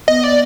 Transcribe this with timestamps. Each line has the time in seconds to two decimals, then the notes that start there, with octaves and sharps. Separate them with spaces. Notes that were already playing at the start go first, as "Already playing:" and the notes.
0.07 B3 D#5
0.24 D5